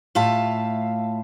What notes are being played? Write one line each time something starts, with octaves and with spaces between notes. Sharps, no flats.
A2 F4 E5 F5 A5